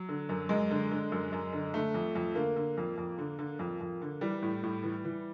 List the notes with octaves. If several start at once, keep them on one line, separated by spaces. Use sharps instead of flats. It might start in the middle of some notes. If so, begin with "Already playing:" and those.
Already playing: F#3
D3
F#2
F#2 G#3
D3
D3
F#2
F#2
D3
D3 A3
F2
F2
D3 A#3
D3
F2
F2
D3
D3
F2
F2
D3
E3 G3
A2
A2
E3
E3